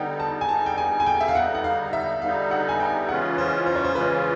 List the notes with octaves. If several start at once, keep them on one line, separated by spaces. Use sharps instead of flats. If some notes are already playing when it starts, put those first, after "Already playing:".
Already playing: D3 G3 B3 D#4 F#5 G5
A5
G#5
D3 G3 B3 D#4 A5
G5
G#5
G#5
G5
E5
F5
D3 G3 B3 D#4 F#5
F#5
F5
E5
D3 G3 B3 D#4 F5
F#5
G#5
G5
C#3 E3 G#3 C#4 F4 F#5
C5
C5
C#5
C5
C#3 E3 G#3 C#4 F4 B4